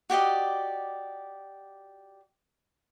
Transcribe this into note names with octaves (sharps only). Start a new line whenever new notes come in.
F#4 G4 D5 D#5